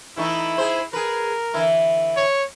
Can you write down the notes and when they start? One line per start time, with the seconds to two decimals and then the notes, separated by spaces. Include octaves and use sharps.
0.17 E3 A3 D#4 E4
0.58 G#4 C5
0.93 G#4 A#4 B4
1.54 D3 E3 E4
2.17 C#5